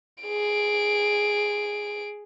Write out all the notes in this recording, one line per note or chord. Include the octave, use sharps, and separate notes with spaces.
G#4 D7